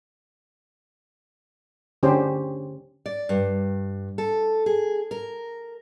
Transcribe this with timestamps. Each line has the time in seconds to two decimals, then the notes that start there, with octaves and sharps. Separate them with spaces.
2.03 D3 C#4 G4 C5
3.06 D5
3.29 G2
4.18 A4
4.66 G#4
5.11 A#4